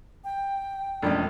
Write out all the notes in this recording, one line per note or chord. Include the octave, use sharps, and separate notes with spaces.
G5
E1 F2 A3 C#4 D4